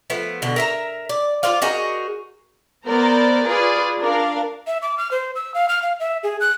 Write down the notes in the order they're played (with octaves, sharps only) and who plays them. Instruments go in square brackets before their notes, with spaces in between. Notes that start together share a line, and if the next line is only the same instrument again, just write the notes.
[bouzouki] F3 A3 B3
B2 D3
A#4 E5 A#5
D5
F4 C5 D5 F5
D#4 F#4 G#4 A#4
[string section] B3 A#4 C5 D5 A#5
F4 G#4 B4 D5
D4 A#4 F5
[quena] E5
D6
F6
C5
E6
F5
F6
F5
E5
G#4
F#6